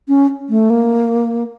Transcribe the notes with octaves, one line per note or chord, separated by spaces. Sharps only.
C#4
A3
A#3